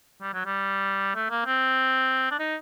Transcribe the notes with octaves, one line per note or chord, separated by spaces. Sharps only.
G3
F#3
G3
A3
A#3
C4
D4
D#4